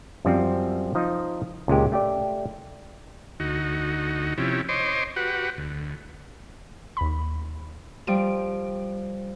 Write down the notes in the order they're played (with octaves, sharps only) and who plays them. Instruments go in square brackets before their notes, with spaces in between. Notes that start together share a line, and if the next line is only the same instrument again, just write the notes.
[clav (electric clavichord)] F#2 F3 G3 C4
F3 D#4 D#5
C#2 A#2 G#3 G4
A3 G4 D5
[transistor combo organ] D2 D#4 F#4
C3 F3 C#4 E4 G4
C5 C#5 D#5 C6 D6
F#4 G4 B4 F#5
D2
[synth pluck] D#2 B5
[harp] F3 G3 [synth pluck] D7